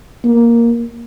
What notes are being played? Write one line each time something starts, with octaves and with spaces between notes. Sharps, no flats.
A#3